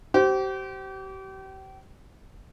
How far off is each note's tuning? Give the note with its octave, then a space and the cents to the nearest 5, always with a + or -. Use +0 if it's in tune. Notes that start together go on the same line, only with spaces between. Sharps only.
G4 -35 C5 +0